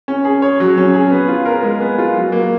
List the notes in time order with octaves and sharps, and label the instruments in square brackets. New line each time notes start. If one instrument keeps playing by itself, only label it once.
[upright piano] C#4
G#4
C#5
F#3
C#4
G#4
B3
F4
A#4
G#3
B3
F4
F#3
A#3